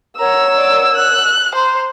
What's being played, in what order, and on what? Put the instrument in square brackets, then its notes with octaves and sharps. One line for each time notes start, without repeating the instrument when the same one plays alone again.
[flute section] A#4 C#5 F#5 [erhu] A#5 [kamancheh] E6
[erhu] D5
F#6
[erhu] C5 [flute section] A#5 C6